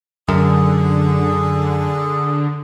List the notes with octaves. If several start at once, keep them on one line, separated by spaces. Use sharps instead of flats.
F#2 D3 G#4 A4